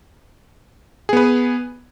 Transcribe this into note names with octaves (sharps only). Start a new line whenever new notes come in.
B3 G#4 B4